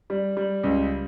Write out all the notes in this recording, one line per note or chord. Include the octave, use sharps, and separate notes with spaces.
G3
G3
C#2